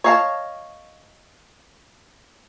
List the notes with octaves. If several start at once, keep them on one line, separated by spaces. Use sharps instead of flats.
C#5 D#5 F5 G#5 A5